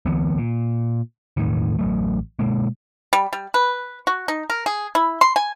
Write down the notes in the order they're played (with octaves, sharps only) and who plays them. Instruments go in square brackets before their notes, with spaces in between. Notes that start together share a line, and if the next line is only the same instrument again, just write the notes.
[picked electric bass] C#2 D#3 F3 B3
A#2
E1 A#1 A2 D#3
A1 F#3 A3
B2 G#3 A#3
[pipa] G3
G3
B4
F#4
D#4
A#4
G#4
E4
C6
G#5